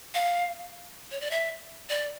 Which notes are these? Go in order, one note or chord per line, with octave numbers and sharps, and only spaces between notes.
F5
C#5
D5
E5
D5